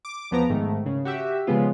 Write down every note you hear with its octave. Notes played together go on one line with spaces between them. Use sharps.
D6
E2 F3 B3 A#5
G#2 D#3 A3
C#3
F#4 G4 E5
C#3 F3 G#3 B3 F4